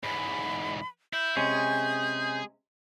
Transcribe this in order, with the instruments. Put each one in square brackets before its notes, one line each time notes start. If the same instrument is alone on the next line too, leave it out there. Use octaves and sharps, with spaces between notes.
[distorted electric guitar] E2 G#2 [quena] B5
[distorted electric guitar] E4 [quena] G6
[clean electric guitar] C3 G#3 C#4 [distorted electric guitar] G#4